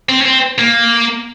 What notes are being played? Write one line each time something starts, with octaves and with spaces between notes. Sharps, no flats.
C4
C#4
C4
A#3